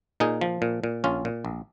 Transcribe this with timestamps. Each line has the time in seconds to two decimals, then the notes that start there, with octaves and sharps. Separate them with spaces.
0.20 A#2 D#4 G#4
0.41 F3
0.62 A#2
0.84 A#2
1.04 A#1 C#4 F4
1.25 A#2
1.45 A#1